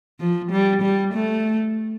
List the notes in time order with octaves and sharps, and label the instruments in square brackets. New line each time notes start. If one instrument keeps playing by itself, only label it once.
[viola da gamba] F3
G3
G3
A3